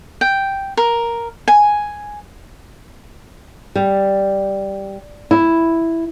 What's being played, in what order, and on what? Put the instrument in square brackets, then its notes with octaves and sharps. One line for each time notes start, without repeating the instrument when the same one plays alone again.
[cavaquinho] G5
A#4
G#5
[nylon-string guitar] G3
E4